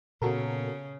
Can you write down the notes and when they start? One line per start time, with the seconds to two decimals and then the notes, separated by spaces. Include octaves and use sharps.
0.22 A#2 C#3 B3 F#4 A4 A#4